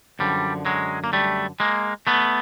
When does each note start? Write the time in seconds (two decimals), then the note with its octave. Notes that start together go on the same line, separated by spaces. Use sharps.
0.19 F#2 D3 F3 G3
0.65 F#3 G#3
1.04 A#3
1.13 G3 A3
1.60 G#3 A#3
2.07 A3 B3